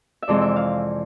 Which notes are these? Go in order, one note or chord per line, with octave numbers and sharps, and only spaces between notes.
E5
F2 C3 E3 G#3 D5
E5
F5